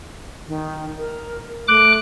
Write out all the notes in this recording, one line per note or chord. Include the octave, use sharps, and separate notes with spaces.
D#3
A#4
A3 D6 F#6